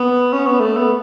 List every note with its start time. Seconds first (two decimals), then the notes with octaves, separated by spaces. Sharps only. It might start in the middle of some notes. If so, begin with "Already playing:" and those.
Already playing: B3
0.33 C#4
0.47 B3
0.60 A3
0.77 B3